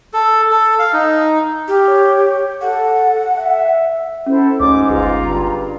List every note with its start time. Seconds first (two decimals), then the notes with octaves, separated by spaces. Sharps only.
0.13 A4
0.51 A4
0.79 F5
0.93 D#4
1.68 G4 F6
1.88 C#5
2.61 A4 F#5
3.35 E5
4.26 C#4 E4 A4 C5
4.60 D2 G#2 C#5 D6
4.89 G1 F4 G#4 B4 A#5
5.26 G2